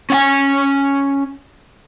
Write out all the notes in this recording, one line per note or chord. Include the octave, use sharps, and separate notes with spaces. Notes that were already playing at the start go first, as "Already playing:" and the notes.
C#4 F#5 G#5